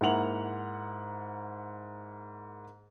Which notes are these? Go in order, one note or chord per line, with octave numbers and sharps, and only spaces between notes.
G#2 A#3 E4 F#5 F7 F#7